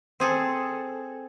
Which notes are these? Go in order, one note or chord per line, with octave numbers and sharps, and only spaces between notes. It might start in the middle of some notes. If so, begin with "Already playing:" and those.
C4 G#4 A4